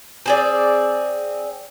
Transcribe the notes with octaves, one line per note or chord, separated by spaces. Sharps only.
C4 G#4 D5